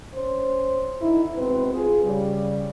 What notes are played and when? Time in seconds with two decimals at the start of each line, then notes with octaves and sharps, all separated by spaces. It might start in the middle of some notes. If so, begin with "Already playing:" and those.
0.14 C#4 C5
1.01 D3 D#4 E4
1.35 G#2 B2 C4 B4
1.73 F4 G#4
2.04 C#3 G3